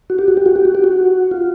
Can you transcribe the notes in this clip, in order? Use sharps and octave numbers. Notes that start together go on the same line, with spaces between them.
F#4
G4
F#4
G4
F#4
G4
F#4
G4
F#4
F4